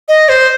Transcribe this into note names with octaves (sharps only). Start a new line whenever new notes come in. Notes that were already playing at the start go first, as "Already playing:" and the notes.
D#5
C5